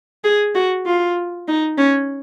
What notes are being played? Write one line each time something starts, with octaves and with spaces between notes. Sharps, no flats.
G#4
F#4
F4
D#4
C#4